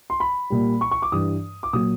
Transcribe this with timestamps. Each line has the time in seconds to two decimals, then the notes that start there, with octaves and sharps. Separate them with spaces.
0.10 C6
0.20 B5
0.50 A#2 G3
0.81 C#6
0.91 C#6
1.02 D6
1.12 G2 E3 G3 D#6
1.63 D6
1.73 A#2 F#3 D#6